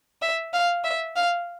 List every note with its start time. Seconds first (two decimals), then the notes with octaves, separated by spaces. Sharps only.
0.22 E5
0.53 F5
0.84 E5
1.16 F5